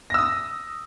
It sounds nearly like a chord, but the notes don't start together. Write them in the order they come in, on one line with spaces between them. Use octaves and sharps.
A#6 E6 D#6